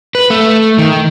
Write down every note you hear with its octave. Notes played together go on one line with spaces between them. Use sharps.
B4
A3
D#3